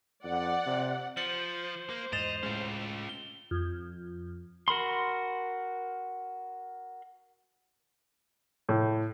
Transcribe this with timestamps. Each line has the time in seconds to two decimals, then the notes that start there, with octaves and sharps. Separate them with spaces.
0.24 F2 D5 F#5
0.66 C3
1.17 F3 C5 A6 C#7 F#7
1.90 A#3
2.13 E2 G#2 D#5 A6 E7 F7
2.43 A2 G#3 C#4 F4
3.09 G7
3.51 F2
4.68 F#4 A#4 B5 C6
8.69 A2